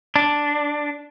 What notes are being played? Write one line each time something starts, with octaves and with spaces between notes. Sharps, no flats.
D4